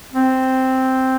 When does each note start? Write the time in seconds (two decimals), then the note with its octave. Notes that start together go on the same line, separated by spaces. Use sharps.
0.13 C4